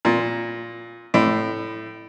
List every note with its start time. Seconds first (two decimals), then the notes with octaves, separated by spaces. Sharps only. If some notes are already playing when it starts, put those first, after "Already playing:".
0.05 A#2
1.14 A2